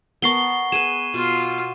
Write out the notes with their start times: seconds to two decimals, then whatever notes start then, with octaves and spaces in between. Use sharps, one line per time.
0.22 B3 A#4 A5 C#6 C7 G7
0.72 G#4 B4 D#7 E7
1.14 B2 F4 F5